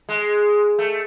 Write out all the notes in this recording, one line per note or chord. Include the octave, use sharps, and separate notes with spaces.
G#3
A3